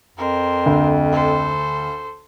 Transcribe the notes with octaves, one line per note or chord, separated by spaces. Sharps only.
F2 A#4 C5
D2
A4 C5